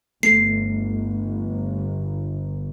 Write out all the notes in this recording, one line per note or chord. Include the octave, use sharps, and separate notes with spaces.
G1 A3 C7